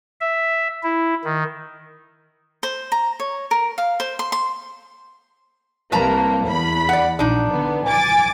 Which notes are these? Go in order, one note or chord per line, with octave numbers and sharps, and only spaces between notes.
E5
E4
D#3
C5
A#5
C#5
A#4
F5
C5
C6
C6
C2 A#3 B4 A5 A#5
E2 B5
D5 F#5
A#1 D4 D#4
D3 B3
G#5 D6 A6